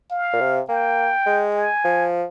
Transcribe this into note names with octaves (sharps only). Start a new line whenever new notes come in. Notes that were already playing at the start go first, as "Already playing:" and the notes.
F5
A#2
C3
A#3 G5
G#3
G#5
F3